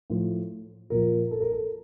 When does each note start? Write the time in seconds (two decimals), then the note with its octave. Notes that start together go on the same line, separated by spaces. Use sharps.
0.10 A2 F3
0.90 A#2 F3 A#4
1.31 A4
1.41 A#4
1.52 A4